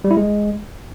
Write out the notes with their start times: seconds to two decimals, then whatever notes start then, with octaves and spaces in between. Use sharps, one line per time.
0.04 G3
0.11 E4
0.17 G#3